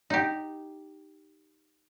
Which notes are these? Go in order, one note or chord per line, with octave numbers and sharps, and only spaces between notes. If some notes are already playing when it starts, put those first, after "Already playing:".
D#4 G4